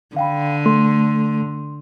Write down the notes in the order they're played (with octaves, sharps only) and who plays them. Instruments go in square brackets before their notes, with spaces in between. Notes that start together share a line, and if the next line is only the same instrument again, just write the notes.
[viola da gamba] D3 [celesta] F5 G5 B5
[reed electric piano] A3 [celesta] C6